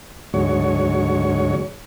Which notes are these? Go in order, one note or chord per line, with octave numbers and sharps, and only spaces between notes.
D2 G#2 F#3 C#5